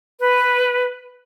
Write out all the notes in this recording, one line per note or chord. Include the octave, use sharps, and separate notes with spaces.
B4